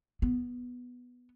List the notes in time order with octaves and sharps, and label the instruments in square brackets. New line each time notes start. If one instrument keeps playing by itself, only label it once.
[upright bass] B3